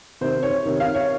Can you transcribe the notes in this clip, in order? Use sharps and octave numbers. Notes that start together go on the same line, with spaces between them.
C3 D#3 C5
C#5
C3 D#3
F5
C#5